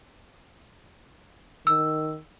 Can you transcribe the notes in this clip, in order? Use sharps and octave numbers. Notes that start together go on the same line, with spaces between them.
D#3 E6